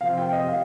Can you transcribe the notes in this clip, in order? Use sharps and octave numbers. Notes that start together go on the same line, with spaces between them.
C3 F3 C4 F4 F5
G5
D#5
F5